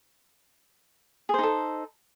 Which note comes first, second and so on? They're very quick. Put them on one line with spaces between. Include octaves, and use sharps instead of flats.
G#4 C5 D#4 A4